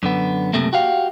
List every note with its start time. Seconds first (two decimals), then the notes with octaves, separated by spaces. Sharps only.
0.03 F#2 D3 B3
0.53 C#2 F#2 C3 A3 A#3
0.73 F#4 G4 F5